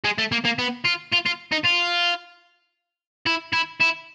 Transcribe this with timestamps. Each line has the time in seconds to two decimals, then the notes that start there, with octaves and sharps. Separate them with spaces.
0.04 G#3
0.18 A3
0.32 A#3
0.45 A#3
0.59 B3
0.85 F4
1.12 F4
1.26 F4
1.52 D#4
1.65 F4
3.26 E4
3.53 E4
3.81 E4